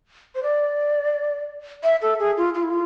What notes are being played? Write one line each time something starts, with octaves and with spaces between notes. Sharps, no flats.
C5
D5
E5
A4
G#4
F4
F4
E4
F4